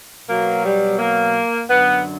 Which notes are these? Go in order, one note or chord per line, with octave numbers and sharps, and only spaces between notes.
B2 F#3 A#3
G3
A#3
F#2 D3 F#3 B3